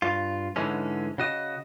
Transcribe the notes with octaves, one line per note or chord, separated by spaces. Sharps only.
G2 F4
G#2 D3 E3 G#3 C#4
C#3 F#4 D#5